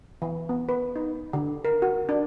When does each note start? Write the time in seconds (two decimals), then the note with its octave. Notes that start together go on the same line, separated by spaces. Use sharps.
0.22 E3
0.49 B3
0.69 B4
0.96 D#4
1.33 D3
1.65 A#4
1.82 F#4
2.09 D4